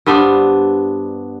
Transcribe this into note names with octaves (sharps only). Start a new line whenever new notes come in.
G2 B3 D4 C5